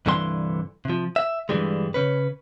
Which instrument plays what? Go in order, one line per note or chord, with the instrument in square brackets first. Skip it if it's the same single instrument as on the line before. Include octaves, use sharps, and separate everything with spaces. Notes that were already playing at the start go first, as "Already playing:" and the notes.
[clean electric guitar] C2 G2 D3 E3 A#5 C6
C3 F3
E5
G2 D3 E3 G3 G#3
C#3 C#4 B4